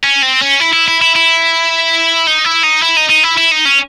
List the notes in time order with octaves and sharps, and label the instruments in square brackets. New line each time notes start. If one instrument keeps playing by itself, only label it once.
[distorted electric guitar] C#4
C4
C#4
E4
E4
E4
E4
E4
D#4
E4
D#4
E4
D#4
D#4
E4
E4
D#4
C#4